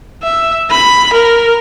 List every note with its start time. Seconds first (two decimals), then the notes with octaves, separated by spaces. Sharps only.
0.23 E5
0.71 B5
1.13 A#4